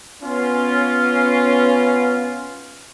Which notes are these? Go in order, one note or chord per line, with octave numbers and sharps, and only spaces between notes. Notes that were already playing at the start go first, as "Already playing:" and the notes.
B3 C#4 F4